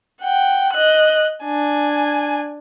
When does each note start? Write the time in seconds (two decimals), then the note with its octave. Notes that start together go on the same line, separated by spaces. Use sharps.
0.21 F#5 G5
0.73 D#5 F#6
1.44 D4 G#5